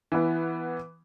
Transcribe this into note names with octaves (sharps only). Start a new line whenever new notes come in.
E3 B3